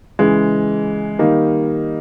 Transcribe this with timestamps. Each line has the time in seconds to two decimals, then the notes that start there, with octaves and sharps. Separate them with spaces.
0.19 C#3 E3 G#3
1.19 D#3 G3 A#3 D#4